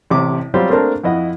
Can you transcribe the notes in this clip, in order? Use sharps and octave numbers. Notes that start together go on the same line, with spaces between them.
A1 C3 D6
F#3 G3 C4 F4 G4 C5
A3 A#3 C4 D4 A#4 A5
F2 E4 D#5 F#5